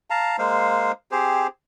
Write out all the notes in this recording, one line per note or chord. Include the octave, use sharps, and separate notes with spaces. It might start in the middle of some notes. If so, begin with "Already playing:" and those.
F5 A5 A#5
G#3 A#3 C5 F5
C4 G4 G#4 C5